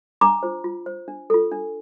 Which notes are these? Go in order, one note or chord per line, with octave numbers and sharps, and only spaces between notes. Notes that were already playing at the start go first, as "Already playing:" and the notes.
D4 A#5 D6
F4 C5
F4
C5
D4
F4 A4
D4